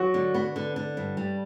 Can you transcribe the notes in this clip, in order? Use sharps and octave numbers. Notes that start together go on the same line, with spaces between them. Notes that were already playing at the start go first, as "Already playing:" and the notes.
Already playing: F#3 F#4
D3
B3
D3
D3
G2
G3